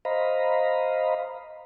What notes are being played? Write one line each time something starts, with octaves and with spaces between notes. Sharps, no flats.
C5 D#5 F5 A#5 B5